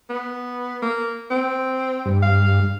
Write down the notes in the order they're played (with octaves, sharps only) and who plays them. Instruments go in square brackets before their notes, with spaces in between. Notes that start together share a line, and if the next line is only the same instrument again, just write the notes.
[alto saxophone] B3
A#3
C4
[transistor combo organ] G2
[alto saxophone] F5